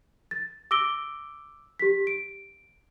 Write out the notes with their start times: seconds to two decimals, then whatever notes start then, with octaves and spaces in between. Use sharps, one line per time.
0.31 A6
0.71 D6 E6 A#6 D7 G7
1.79 G4 B6
2.07 D7